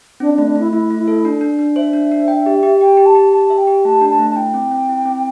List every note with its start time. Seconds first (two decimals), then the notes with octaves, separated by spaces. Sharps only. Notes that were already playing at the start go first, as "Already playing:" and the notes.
0.20 C4 D4
0.34 D4
0.38 A3
0.46 D4
0.56 A3 E4
0.72 A3 E4
0.90 A3
0.99 E4
1.08 A4
1.25 D4
1.41 D4
1.59 D4
1.76 C5 E5
1.93 D4
2.12 D4
2.28 G5
2.46 G4
2.63 G4
2.81 G4 G5
2.97 G4
3.06 A5
3.15 G4
3.33 G4 A5
3.50 E5
3.58 G5
3.67 G4
3.85 A3 A5
4.01 D4
4.10 A5
4.19 A3
4.31 A5
4.36 E4 G5
4.54 C4
4.71 C4
4.89 E4
5.05 C4